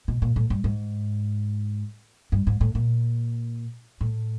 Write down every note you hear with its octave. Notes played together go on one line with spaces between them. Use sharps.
B2
A#2
A2
G2
G#2
G2
G#2
A2
A#2
A2